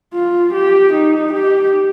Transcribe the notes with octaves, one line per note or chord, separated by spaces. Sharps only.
F4
G4
D#4
G4